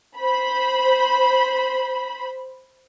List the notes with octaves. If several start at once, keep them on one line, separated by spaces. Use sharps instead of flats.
C5 B5